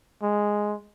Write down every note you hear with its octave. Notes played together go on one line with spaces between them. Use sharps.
G#3